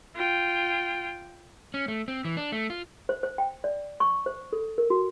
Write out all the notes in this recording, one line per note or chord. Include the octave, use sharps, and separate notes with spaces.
F4 G5
C#4
A3
C4
E3
D4
A3
F4
C5
C5
G5
D5
C#6
C5
A4
A#4
F#4